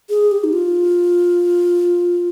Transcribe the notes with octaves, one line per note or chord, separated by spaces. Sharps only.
G#4
G4
D#4
F4